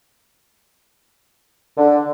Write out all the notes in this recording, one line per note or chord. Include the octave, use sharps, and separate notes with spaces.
D3